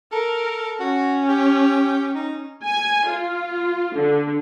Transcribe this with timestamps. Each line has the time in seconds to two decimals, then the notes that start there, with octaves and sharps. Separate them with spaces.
0.12 A4 A#4
0.80 C#4 F#4
1.29 G4
2.15 D#4
2.65 G#5
3.08 F4
3.95 D3